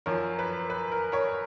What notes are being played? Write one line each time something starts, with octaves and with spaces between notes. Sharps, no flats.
F#2 F3 A#4 C#5
B4
B4
A#4
A#4 C#5